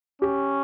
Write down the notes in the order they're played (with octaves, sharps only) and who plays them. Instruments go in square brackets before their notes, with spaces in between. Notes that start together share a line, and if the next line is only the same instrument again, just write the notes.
[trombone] C#4 [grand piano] G4